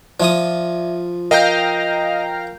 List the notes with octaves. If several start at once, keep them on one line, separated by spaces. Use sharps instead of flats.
F3 F4 D5 E5 D#6
A#4 D#5 F5 G5 A#5 G6